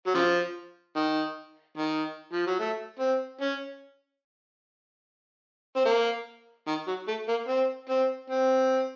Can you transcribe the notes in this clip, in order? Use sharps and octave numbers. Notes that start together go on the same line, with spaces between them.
F#3
C#3 F3
D#3
D#3
F3
F#3
A3
C4
C#4
C4
A#3
D#3
F#3
A3
A#3
C4
C4
C4